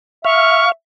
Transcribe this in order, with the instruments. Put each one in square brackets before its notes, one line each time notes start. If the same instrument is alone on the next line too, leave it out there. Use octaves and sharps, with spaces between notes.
[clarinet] E5 [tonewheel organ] F5 [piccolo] C#6